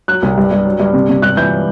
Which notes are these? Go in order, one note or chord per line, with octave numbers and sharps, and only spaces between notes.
F#3 F#6
C2
G2
G2
F#3
G2
C3
C3
G2 F#6
E3 G6